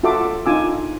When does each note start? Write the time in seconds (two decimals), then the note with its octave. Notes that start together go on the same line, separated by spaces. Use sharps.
0.03 F4 F#4 A4 E5 C6 D6
0.46 D4 D#4 F4 G#5 D6 E6